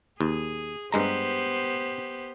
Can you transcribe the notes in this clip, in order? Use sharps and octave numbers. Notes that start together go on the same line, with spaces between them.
D#2 G#4
G2 G#3 B3 G4 C5 A#5